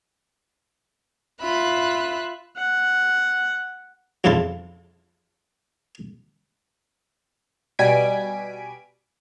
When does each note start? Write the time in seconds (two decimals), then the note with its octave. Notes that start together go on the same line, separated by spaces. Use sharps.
1.41 F4 E5 B5 F#6
2.57 F#5
4.24 B1 F2 C#3 E4 F4 A5
7.79 B2 G3 G#5 G#6 B6 D7